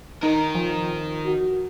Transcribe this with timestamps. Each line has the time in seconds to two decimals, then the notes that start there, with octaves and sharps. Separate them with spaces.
0.23 D#3 D#4 A#4
0.55 F3
1.26 F#4